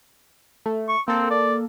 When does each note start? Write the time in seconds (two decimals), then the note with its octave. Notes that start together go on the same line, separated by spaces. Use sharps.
0.66 A3
0.89 C#6
1.08 A#3 C4 A4
1.30 D5